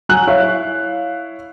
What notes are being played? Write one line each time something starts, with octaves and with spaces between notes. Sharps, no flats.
F#3 G#5 F#6 F#7
E4 C#5 F5